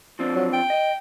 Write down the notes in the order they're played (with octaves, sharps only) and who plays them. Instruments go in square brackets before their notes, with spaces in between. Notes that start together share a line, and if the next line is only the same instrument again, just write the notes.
[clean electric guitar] F3 C4 D4
[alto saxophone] F#3
G5
[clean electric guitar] D#5